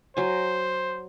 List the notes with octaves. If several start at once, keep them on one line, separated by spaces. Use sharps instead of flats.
F#3 C5 G#5